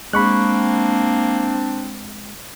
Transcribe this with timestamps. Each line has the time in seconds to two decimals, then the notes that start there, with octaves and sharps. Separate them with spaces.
0.13 G#3 A#3 C4 D4 B5 C#6 F#6